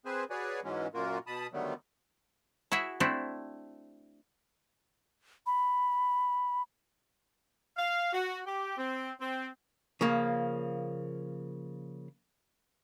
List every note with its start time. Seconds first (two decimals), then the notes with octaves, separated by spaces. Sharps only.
0.05 C4 G#4 B4 C5 G#5
0.30 F#4 G#4 B4 C#5 D5 G#5
0.64 G#2 E3 F#3 G#3 C#4
0.94 F#2 A#2 A#3 F4 F#4 A#4
1.27 B2 A5 B5 D#6
1.53 D3 D#3 F#3 G3 A3 B3
2.72 E4 F#4 G#4 E5
3.00 A3 C4 D4 E4
5.46 B5
7.77 F5
8.13 F#4
8.46 G4
8.77 C4
9.20 C4
10.01 C#3 F3 A#3